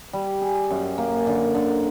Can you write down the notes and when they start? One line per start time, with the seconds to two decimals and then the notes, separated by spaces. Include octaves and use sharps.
0.13 G3
0.42 G#4
0.70 F#2
0.98 A#3
1.27 D3
1.55 D3